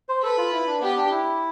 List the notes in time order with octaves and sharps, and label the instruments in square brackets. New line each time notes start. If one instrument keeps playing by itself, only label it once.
[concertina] C5
[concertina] A4 [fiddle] B4
[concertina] F4
E4
D4
[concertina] B3 [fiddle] G4
[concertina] D4
E4